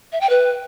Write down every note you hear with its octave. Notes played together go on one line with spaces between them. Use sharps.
E5
G5
B4